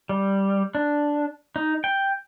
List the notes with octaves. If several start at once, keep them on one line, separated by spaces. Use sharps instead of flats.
G3
D4
D#4
G5